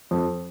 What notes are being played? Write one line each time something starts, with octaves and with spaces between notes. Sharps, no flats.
F2